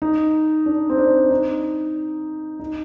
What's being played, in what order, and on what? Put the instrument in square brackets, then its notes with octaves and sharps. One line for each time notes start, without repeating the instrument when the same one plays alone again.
[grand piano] D#4
D4
C4
D4
D#4
D#4